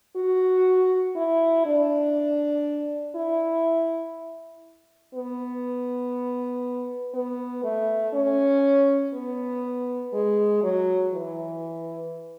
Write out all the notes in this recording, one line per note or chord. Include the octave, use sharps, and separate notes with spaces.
F#4
E4
D4
E4
B3
B3
A3
C#4
B3
G#3
F#3
E3